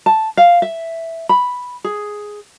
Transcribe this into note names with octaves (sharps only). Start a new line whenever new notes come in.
A5
F5
E5
B5
G#4